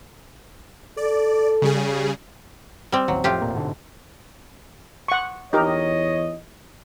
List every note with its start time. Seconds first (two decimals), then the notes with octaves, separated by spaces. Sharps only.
0.97 A4 D5
1.62 C#3 G3 G#4
2.92 G3 C4
3.08 A1 D#2 F#3
3.24 F2 A2 F4 G4
3.42 F1 A#2 A#3
3.55 G#2 B2 D3
5.08 F#5 C#6
5.53 E2 D#4 G4 A#4 C#5 D#5